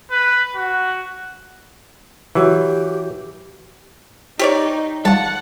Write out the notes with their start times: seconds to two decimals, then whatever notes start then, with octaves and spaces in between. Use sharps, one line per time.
0.11 B4
0.56 F#4
2.35 E3 F#3 G4
4.39 D#4 G4 C#5 D5
5.05 G3 F4 F#5 A5